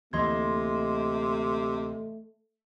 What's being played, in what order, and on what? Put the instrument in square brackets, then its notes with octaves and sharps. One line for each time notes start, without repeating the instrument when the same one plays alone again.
[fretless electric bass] D2 E3 A#3 [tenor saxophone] C3 [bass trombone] A3 [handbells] D#5 C6 G#6